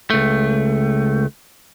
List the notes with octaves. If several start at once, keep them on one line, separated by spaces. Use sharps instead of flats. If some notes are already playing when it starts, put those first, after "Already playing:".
C#2 A3